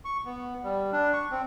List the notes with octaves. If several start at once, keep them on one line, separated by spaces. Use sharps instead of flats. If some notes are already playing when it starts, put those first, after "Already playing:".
C#6
B3
G3
D4
C#6
C4